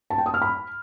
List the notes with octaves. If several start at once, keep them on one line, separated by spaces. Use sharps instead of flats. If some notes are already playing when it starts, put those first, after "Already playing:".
A5
G5
D#6
F6
B5